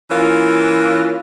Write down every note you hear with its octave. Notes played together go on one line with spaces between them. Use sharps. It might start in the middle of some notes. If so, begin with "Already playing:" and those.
E3 A#3 C#4 F4